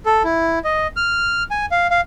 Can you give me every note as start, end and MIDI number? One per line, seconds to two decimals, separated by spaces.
0.06 0.23 69
0.24 0.59 64
0.64 0.87 75
0.97 1.43 89
1.51 1.66 80
1.71 1.87 77
1.90 2.01 77